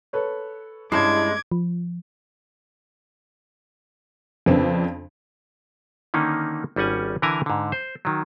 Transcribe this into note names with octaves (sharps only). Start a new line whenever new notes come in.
A4 B4 C#5
G2 G#3 C#4 E4 A5 D6 G#6 C7
F3
F2 C#3 B3 C4 D4
D3 D#3 A#3 C#4 D#4
G#1 G3 C#4 F#5 G#5
D3 E3 E4 A#4 G#5 A#5
G#2 D3
C5
D#3 F#3